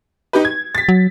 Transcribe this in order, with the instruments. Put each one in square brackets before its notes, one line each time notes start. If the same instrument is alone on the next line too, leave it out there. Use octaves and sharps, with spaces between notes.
[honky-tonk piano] D#4 G4 B4
G#6
A6 B6
[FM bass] F#3